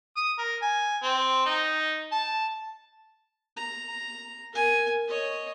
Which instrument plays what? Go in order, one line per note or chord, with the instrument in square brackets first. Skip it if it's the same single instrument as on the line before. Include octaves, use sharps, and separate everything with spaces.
[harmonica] D#6
A#4
G#5
C4
D#4
A5
[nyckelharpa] A#5
A#4 G#5
C#5 D#5